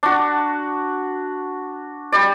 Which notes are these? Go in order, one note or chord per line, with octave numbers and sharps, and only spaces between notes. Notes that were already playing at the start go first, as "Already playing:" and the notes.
D4 F#4
G3 D5